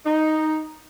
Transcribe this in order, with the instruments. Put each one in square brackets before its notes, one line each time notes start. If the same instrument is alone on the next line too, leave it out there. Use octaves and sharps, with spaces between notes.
[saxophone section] D#4